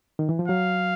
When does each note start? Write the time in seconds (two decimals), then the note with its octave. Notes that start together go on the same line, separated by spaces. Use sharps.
0.19 D#3
0.29 E3
0.39 F3
0.48 F#3 F5